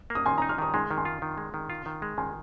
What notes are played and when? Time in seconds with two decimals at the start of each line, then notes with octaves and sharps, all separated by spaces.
0.10 A#3
0.15 D#6
0.26 D#3 G#5 C6
0.37 A#5 D#6
0.42 D#4
0.49 C6 F6
0.58 D#3 A#5 D#6
0.74 G#3 G#5 C6
0.91 D#3
0.98 G#5 C6
1.05 F4
1.22 D#3
1.38 G#3
1.54 D#3
1.70 F4
1.86 D#3
2.02 G#3
2.18 D#3 G#5 C6